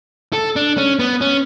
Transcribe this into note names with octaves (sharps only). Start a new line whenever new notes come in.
A4
D4
C#4
B3
C#4